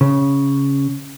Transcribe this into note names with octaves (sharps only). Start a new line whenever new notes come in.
C#3